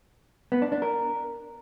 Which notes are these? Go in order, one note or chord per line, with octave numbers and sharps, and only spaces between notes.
B3
D4
D4
A#4